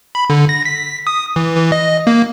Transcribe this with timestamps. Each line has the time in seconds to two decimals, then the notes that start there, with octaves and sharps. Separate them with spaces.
0.15 B5
0.30 D3
0.49 A#6
0.65 B6
1.07 D#6
1.36 E3
1.57 E3
1.72 D#5
2.07 A#3